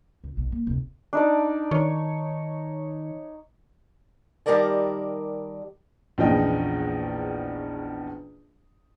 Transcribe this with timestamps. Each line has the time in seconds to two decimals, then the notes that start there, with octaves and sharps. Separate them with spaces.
0.24 C#2
0.37 B1 B2
0.52 A#3
0.67 F1 D2
1.13 D4 D#4 D5
1.71 D#3 C#5
4.46 D#3 G3 G4 A#4 D5 A5
6.18 A#1 E2 C#3 F3 D#5 G5